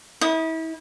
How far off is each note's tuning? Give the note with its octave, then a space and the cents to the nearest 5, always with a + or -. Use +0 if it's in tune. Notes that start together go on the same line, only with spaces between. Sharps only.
E4 -35 D#6 +0